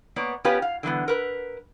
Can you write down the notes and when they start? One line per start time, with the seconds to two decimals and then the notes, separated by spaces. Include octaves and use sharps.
0.16 A#3 B3 C#5 D5
0.45 B3 C#4 F4 G4 B4
0.62 F5
0.83 D3 E3 G3 B3
1.08 A#4 B4